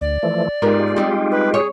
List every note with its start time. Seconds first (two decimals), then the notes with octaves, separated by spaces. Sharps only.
0.01 D2 D5
0.23 E3 F3 A3
0.62 G#2 G#3 B3 F4 G4 A#4
0.96 G3 C4 D#4
1.31 B4
1.54 G#4 C#5